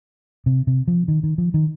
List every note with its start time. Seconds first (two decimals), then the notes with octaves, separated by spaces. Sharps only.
0.46 C3
0.67 C3
0.88 F3
1.08 D#3
1.23 D#3
1.38 F3
1.54 D#3